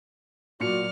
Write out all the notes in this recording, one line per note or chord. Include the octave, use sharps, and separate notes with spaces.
A#2 F#3 F#4 D5 F6 C#7